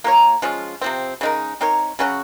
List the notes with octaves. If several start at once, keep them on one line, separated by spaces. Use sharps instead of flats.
A#3 F4 A#4 C#5
F3 G#3 C#4 F4
C3 F3 C4
C#3 G#3 D#4 A#4
C4 D#4 A#4 C#5
C#3 F#3 C#4 F#4